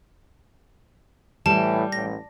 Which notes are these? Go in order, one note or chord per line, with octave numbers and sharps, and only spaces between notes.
A2 E3 G3 A5
A1 A#6